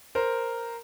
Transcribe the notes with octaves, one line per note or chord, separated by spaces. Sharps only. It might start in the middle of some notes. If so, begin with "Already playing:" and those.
A#4 C5